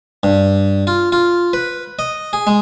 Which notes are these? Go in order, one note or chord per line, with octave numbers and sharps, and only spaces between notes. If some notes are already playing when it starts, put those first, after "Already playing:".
G2
F4
F4
B4
D#5
G#4
G#3